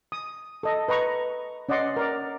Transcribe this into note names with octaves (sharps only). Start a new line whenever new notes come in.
D#6
A4 D#5
B4 D#5 A#5 C#6
C#4 D5 D#5 F#5 C6
A#4 D5